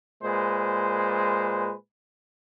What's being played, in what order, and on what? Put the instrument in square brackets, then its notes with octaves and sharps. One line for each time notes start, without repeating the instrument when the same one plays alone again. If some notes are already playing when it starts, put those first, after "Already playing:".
[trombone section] A#2 G#3 B4 C5